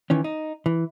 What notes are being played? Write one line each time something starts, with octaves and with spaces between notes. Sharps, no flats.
D#3 E3 C#4
D#4
E3